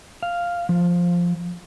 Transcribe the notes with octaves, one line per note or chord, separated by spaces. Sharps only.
F5
F3